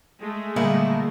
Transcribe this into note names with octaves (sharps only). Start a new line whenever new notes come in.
G#3 A3
A#2 D3 D#3 G3 A#3 E4 G#4